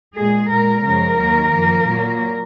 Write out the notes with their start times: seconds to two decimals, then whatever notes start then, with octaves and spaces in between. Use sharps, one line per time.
0.16 A#2 G#3 G#4
0.51 A#2 G#3 A#4
0.85 F#2 C#3 F3 G#3 A#4
1.19 D#2 D#3 F#3 A#3
1.53 F#2 F3 A#3
1.87 A#2 F#3 A#3